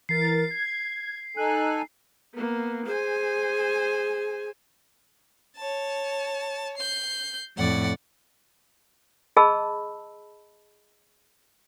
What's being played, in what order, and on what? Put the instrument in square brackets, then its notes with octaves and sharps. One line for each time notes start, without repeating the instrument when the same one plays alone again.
[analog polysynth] E3 A#4 A6 [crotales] C7
[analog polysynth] G#6
[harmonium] D#4 A4 G#5 [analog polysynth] F#6
[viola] A#3 B3
[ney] G#4 [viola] C5 G#5
[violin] C#5 A5
G6 C7
[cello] F2 A2 [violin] D5 F#5
[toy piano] G#4 D#5 A5 B5 E6